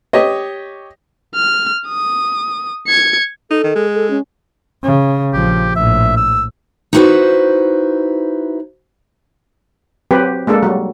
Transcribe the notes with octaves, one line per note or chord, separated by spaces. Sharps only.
G4 C#5 D#5
F6
D#6
G#6 C#7
D#4 A4
D#3
G#3
A4
C#4
C#3
A#1 F3 G4
A#1 A2 E5
E6
D#4 E4 F#4 A4 B4 C5
F#3 C4 G4 B4
G#3 A#3 D4 A4
F#3 G3